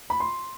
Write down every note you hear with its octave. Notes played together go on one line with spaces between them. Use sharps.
B5
C6